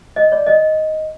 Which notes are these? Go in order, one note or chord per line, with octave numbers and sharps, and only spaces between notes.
D#5
D5
D#5